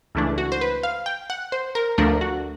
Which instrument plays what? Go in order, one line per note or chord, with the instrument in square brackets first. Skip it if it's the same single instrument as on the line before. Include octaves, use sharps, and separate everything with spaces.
[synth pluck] C#2 C#3 E3 A3 D4
F#4
C5
B4
F5
G5
F#5
C5
A#4
D2 D3 F3 A3 D4 A#4
F#4